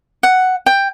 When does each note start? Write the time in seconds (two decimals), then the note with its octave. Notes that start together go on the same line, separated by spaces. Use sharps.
0.23 F#5
0.66 G5